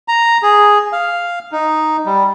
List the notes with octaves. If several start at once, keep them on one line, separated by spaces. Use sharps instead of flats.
A#5
G#4
F5
D#4
G3